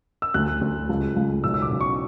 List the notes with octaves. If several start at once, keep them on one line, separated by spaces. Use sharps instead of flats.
E6
D2 F#6
D2
C#2
C#2
B1 E6
E6
D6
B1
C#6